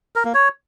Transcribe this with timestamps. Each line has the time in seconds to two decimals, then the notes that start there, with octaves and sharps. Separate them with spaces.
0.16 A#4
0.25 A#3
0.34 C#5